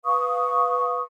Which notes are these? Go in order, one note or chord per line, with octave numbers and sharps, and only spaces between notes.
B4 F5 C#6 D#6